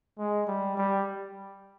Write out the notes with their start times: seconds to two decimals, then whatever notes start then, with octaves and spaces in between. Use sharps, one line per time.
0.19 G#3
0.47 G3
0.77 G3